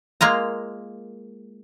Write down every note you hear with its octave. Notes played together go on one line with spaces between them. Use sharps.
G#3 A#3 F4 A#5